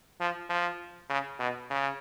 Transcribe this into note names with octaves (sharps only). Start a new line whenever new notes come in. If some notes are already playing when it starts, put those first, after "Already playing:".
F3
F3
C#3
B2
C#3